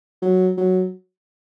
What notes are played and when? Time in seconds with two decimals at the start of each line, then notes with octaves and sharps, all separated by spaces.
0.22 F#3
0.57 F#3